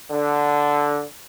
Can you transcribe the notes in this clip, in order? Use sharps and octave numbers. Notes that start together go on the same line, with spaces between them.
D3